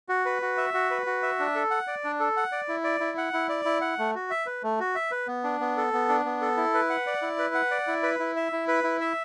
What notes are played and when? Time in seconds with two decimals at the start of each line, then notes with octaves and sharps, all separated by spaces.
0.09 F#4
0.25 B4
0.42 F#4
0.57 E5
0.74 F#4
0.91 B4
1.06 F#4
1.22 E5
1.39 D4
1.55 A4
1.71 F#5
1.87 D5
2.04 D4
2.20 A4
2.37 F#5
2.52 D5
2.68 E4
2.84 D5
3.00 E4
3.18 F#5
3.33 E4
3.49 D5
3.65 E4
3.81 F#5
3.99 A3
4.15 F#4
4.31 E5
4.46 B4
4.63 A3
4.80 F#4
4.95 E5
5.11 B4
5.27 B3
5.44 D4
5.60 B3
5.77 A4
5.93 B3
6.09 D4
6.25 B3
6.41 A4
6.57 E4
6.74 B4
6.90 F#5
7.07 D5
7.22 E4
7.39 B4
7.55 F#5
7.71 D5
7.87 E4
8.03 B4
8.19 E4
8.36 E5
8.53 E4
8.68 B4
8.84 E4
9.00 E5